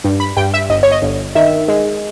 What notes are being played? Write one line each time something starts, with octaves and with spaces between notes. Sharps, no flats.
G2
B5
G2 G5
E5
G1 D#5
C#5
D#5
G1
D#3 E5
G#3